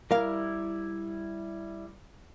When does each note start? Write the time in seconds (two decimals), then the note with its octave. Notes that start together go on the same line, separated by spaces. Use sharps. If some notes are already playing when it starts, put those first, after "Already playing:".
0.11 G3 E4 A#4 F5